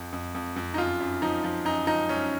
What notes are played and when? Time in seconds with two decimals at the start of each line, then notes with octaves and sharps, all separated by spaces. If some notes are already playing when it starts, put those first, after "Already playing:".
Already playing: F2
0.12 F2
0.35 F2
0.56 F2
0.74 D#4
0.78 F#2 F4
1.00 F#2
1.22 F3 D#4
1.44 F3
1.65 F#2 D#4
1.87 F3 D#4
2.09 F#2 C#4